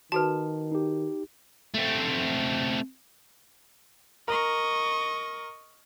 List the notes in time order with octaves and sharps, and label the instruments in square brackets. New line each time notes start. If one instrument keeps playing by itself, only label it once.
[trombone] D#3 [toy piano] F#4 A4 B4 [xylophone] A5
[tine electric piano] D#4 G4
[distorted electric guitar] A3 C4
[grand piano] A#4 [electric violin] D#5 C#6